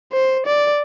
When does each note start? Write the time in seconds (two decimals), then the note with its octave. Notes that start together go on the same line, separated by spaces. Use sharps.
0.12 C5
0.46 D5